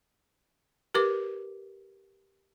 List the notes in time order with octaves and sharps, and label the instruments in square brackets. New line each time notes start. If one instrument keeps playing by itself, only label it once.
[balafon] G4 A#4 B4 D6